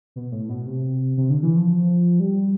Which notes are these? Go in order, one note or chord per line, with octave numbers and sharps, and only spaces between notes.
B2
A2
B2
C3
C3
D3
E3
F3
G3